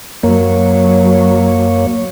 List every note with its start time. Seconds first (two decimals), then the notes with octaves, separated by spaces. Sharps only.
0.23 F#2 F#3 A#3 C#5